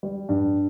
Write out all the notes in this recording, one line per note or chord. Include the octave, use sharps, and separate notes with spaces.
G3
G2